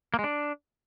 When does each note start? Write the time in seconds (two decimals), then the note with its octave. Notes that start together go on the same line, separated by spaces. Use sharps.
0.14 A#3
0.19 G#3
0.24 D4